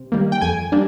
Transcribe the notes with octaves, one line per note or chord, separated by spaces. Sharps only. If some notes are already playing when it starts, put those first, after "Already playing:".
Already playing: C3
D#3 G3 A#3
G5
F2 G#5
G3 A#3 D4